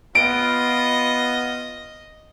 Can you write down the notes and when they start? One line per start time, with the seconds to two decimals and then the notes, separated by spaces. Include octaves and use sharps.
0.15 B3 F4 D#5 D7